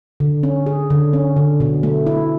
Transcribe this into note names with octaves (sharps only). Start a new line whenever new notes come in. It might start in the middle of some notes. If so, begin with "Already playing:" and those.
D3
C#4
G#4
D3
C#4
D3
B2
A3
E4